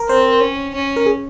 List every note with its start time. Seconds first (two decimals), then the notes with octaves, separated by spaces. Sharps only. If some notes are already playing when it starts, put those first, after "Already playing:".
Already playing: A#4
0.09 C4 C5
0.41 C#4
0.74 C#4
0.96 A#4
1.06 G#4